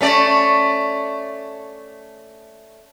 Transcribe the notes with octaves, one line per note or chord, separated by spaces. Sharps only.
A3 C#4 D5